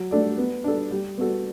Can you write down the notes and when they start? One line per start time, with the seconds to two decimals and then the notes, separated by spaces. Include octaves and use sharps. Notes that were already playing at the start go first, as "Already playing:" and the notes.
Already playing: F#3
0.11 A3 D4 A4 D5
0.38 B3
0.64 D4 A4
0.91 G3
1.18 B3 F#4 A4